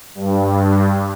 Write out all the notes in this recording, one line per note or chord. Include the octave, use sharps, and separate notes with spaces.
G2